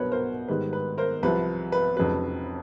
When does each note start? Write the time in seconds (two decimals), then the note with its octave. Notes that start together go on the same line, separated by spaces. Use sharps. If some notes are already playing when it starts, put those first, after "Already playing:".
Already playing: C2 B2 F#3 B3 D4 A#4 B4 C#5
0.11 A#4 C5
0.48 G#2 D#3 G3 B4
0.73 B4
0.98 A#4 C5
1.23 C2 C3 F3 B4
1.72 B4
1.96 F1 F2 C#3 F#3 B4